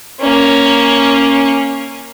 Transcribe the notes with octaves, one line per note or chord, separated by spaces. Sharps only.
A#3 C#4